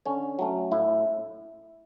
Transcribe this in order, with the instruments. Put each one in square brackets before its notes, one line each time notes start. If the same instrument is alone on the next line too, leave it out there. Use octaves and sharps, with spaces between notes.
[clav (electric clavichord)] D3 C#4 C#5
F#3 A3 C#4
A2 E4 E5